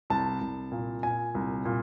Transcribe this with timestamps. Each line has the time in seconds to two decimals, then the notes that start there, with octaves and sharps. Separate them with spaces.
0.10 C2 A5
0.41 C2
0.72 A#2
1.03 A#2 G#5
1.35 C2
1.65 A#2